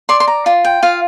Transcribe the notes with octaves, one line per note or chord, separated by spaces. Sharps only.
D5 C6
C6
A#5
F4 C6
G5
F4 F5